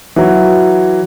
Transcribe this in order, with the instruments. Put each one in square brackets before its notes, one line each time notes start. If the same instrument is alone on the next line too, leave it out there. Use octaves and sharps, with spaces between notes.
[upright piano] E3 F#3